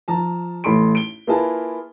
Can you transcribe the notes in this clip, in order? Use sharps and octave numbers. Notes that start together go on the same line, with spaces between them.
F3 A5 A#5
A1 A3 B5 C6 D7
D7 G7
A#3 E4 F4 G#4 B4 A5